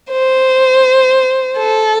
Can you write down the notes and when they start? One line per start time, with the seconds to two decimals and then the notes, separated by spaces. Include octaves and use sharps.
0.11 C5
1.57 A4